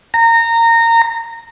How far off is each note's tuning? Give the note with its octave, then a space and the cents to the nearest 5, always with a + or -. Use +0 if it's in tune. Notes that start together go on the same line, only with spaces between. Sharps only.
A#5 -20